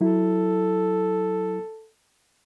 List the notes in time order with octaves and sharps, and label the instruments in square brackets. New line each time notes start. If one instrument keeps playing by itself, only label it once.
[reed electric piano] F#3 E4 [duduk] A4